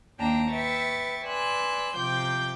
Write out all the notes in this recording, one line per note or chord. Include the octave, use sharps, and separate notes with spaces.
D#2 A#3 D4 G5 A5 A#5
B4 E5 G5 C#6 A6
B4 D5 G#5 C6 E6 F#6
C3 F3 G5 D6 G6